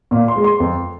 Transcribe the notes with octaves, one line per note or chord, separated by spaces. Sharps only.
A#2 F5
C6
G#3
C6
F2